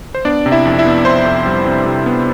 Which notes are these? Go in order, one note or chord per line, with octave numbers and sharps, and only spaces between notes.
C5
B3 D4 D5
C3
E4 E5
F2
E4 E5
B3
F2 C5 C6
F2
G3
C3
C3
B3